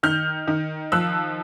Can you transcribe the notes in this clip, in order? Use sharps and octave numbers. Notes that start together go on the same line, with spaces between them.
D#3 F6 G6
D#3
F3 E6 F#6